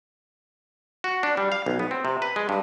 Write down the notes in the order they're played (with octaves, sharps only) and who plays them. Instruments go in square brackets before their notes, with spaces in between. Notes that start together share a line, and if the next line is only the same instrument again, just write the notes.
[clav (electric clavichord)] F#4
D4
G3
F5
B1
B3
C4
C3
B4
G#3
G2